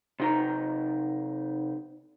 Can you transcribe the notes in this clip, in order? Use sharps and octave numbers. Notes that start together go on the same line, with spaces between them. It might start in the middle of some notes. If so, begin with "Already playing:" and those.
C3 D#4 A#5